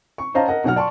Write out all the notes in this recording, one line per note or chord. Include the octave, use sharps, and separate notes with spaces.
C#6
C#4 C5 D#5 F5 A5 A#5
A#4 D#5 F#5
B2 F#3 F#5 F6
D5 A5 C6 C#6